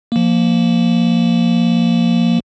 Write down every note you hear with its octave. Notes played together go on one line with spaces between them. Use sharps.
F3 A#3